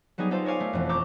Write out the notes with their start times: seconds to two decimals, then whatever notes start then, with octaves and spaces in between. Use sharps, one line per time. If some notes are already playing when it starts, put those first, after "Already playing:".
0.18 F#3 G3 B3 D#4 G#4
0.31 D#4 F4 G#4 A4 C5
0.45 A#4 C#5 D5 F5 G#5
0.60 A3
0.73 E1 F2
0.89 A5 A#5 C#6 D6 E6 G6